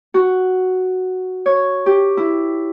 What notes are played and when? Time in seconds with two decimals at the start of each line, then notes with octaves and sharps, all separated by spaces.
0.14 F#4
1.46 C#5
1.86 G4
2.17 E4